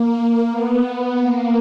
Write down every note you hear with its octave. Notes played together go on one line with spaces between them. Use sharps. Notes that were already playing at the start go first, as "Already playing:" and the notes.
Already playing: A#3
B3
A#3